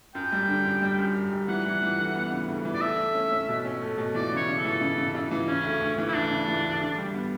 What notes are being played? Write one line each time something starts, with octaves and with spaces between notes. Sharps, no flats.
F#2 G5
G3
D3
F#2
G3
F#2
F#2
G3
E3 F#5
E3
E3
D2
B3
C#3
D2
E3
D5
A3 E5
A3
C#4
C#4
B2
C#4
A3
B2
E3 D5
C#3
C#5
C#3
A4
E3
C#3
C#3
C#3
E3
C#3 C#4
D2
D2
E3
E4
D2 D4
C#3
E3
D2
D3
G3
B3